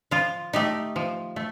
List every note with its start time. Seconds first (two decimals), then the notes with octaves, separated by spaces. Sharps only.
0.11 F3 F4
0.53 A3 D#4 G4
0.96 F3
1.36 A3